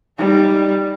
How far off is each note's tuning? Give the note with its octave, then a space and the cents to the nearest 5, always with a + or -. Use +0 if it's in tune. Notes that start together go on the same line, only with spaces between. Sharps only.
G3 +0 D#4 +0